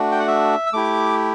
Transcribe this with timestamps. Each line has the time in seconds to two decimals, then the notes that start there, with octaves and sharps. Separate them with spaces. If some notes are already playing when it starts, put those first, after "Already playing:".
Already playing: A3 D4 F#4
0.12 G5
0.19 F#5
0.28 E5
0.66 E6
0.73 A3 E4 G4 D6